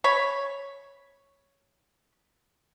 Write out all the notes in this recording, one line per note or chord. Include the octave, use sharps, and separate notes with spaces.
C#5 B5